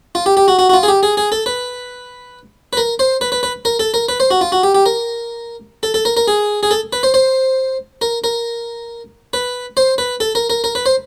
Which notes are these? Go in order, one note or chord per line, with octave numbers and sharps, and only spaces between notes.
F4
G4
G4
F#4
F#4
F#4
F4
G#4
G4
G#4
G#4
A4
B4
B4
A#4
C5
B4
B4
B4
A#4
A4
A#4
B4
C5
F#4
F4
F#4
G4
G4
A#4
A4
A4
A#4
A#4
G#4
G#4
A4
B4
C5
C5
A#4
A#4
B4
C5
B4
A4
A#4
A#4
A#4
B4
C5